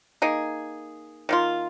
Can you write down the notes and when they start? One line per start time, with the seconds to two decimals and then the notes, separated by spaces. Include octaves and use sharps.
0.22 A#3 D#4 G#4
1.29 D#3 A#3 F4